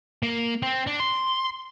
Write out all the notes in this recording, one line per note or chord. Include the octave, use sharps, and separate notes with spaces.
A#3
C4
D4
C6